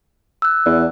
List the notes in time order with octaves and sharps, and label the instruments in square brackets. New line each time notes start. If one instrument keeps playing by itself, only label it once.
[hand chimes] E6 F#6
[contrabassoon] E2 [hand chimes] D5